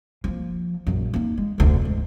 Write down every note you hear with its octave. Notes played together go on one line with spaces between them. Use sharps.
F3 A#3
A#1 F#2
A#3 D#4
G#3
F1 D2
E2 G#2